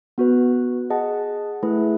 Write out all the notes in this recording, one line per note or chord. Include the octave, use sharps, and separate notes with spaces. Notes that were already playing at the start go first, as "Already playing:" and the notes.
B3 F#4 B4
G#4 D#5 F#5 A5
A3 E4 G#4 B4